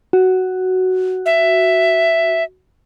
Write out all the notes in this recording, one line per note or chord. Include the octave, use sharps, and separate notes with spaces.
F#4
E5